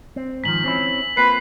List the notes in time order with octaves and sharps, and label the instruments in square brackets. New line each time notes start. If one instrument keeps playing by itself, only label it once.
[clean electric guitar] C4
[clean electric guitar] G#2 D#3 F3 [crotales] B6 F#7
[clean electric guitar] C4 C#4 E4
[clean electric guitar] A#3 C4 F4 [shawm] B4 [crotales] C7